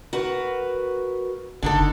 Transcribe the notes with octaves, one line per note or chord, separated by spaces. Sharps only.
F#4 A#4 B4
F#1 D3 D#4 A4